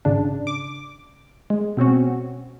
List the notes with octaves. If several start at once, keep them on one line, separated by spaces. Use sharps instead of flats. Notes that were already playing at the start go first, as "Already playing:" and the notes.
G#1 C#3 D4
D6
G#3
B2 C4 C#4 F#4